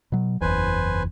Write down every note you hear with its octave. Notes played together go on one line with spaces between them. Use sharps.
B2 F#3
F#1 E2 B4 C5 G#5